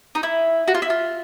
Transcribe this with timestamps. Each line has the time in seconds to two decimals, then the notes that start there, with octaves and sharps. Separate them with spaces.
0.15 D#4
0.23 E4
0.68 F#4
0.75 F4
0.82 E4
0.90 F4